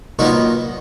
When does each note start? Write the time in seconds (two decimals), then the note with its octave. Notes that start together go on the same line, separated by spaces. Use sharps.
0.19 A#2 F#3 B3 D#4 F#4